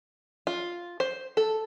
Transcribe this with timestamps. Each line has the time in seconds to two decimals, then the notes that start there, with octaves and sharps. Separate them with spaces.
0.47 F4
1.00 C5
1.37 A4